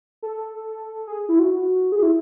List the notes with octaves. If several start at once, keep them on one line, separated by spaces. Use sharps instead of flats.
A4
G#4
E4
F#4
G#4
E4